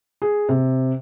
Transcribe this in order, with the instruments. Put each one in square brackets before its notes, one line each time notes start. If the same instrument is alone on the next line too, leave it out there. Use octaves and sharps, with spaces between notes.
[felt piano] G#4
C3